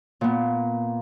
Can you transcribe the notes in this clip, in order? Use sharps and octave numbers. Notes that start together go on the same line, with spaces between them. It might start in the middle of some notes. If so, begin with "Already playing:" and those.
A#2 B3